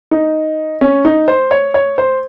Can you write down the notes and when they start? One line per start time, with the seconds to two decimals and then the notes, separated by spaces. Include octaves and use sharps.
0.11 D#4
0.81 C#4
1.05 D#4
1.28 C5
1.51 C#5
1.74 C#5
1.98 C5